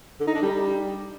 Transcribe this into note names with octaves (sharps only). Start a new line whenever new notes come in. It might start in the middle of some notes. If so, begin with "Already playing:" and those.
D3
D#4
D4
G3